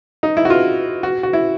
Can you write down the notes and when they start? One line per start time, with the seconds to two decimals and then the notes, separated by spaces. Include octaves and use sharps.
0.23 D#4
0.37 E4
0.45 F#4
0.50 F4
1.03 F#4
1.23 F#4
1.33 E4